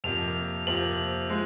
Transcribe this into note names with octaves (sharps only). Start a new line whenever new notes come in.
F2 C3 F3 A#3 F7
F2 C3 F3 A#3 F#7
F3 G#3